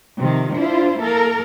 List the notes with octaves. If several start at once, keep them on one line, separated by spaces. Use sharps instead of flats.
C3 D#3 F3
D4 E4 F4 C5
A#3 A4 A#4